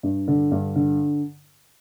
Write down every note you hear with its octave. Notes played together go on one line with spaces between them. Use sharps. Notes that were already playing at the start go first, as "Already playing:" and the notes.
G2
D3
G2
D3